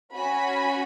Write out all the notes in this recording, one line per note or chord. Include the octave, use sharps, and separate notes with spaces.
C#4 F#4 G#5 B5